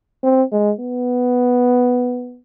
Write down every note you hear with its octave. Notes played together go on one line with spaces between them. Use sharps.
C4
G#3
B3